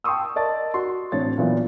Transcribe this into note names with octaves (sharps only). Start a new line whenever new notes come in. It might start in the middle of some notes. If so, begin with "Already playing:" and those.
G5 A5 C6 C#6 D#6 E6
A#4 D5 D#5 A5 A6
F#4 C6
A1 C4 D4 C#5 A6
A#2 E3 F#3 B3 F4